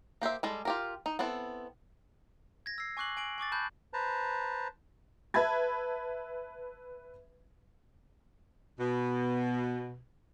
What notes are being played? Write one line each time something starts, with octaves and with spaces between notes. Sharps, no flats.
A#3 G4 C5 E5
G3 G#3 A4
F4 G4 A#4
D#4
B3 C4 E4 A4
G#6 A#6
E6 C7
G#5 C#6 D6 F#6 C7 F#7
G#5 D7 F#7
G#5 C#6 D6 A6
A5 B5 F#6 G6
B4 C5 A5 A#5
B4 E5 A5 B5 G#6
B2